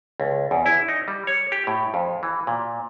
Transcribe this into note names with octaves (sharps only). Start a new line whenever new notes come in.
C#2
E2
E4
D#4
G3
C#5
G4
A2
F2
E3
A#2